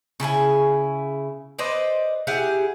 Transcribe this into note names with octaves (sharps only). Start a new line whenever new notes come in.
C#3 E4 A4 G#5
B4 C5 D5 D#5
E4 G4 G#4 F#5